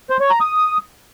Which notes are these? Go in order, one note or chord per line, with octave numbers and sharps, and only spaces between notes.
C5
C#5
A#5
D#6